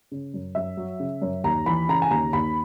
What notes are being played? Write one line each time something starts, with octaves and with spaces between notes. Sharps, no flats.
C#3
F#2
F#2 E5
F#3
C#3
F#2
D#2 A#5
E3 B5
C#3 A#5
G#5
D#2 A#5
D#2 B5